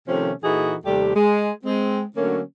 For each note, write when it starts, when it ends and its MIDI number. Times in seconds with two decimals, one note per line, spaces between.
0.08 0.32 48
0.08 0.32 51
0.08 0.32 53
0.08 0.32 57
0.08 0.32 60
0.08 0.32 61
0.43 0.75 46
0.43 0.75 52
0.43 0.75 63
0.43 0.75 66
0.43 0.75 68
0.43 0.75 69
0.85 1.11 39
0.85 1.11 48
0.85 1.11 55
0.85 1.11 57
0.85 1.11 67
1.15 1.51 56
1.65 2.03 56
1.65 2.03 60
2.17 2.41 50
2.17 2.41 54
2.17 2.41 57
2.17 2.41 58
2.17 2.41 61